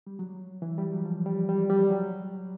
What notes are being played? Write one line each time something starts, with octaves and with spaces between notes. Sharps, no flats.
G3
F#3
E3
G3
F#3
F3
G3
G3
G3
F#3